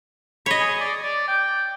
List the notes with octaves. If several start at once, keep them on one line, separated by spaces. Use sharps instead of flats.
C#5 D#5 B5
G#4
D5
D5
G5